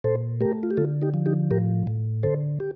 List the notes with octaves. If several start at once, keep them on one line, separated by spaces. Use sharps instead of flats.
A#2 A4 C5
A3 G4 A#4
F4
G4
D3 F4 A4
D#4 G4
F3
D#4 G4
A2 G4 A#4
A2
D3 A4 C5
G4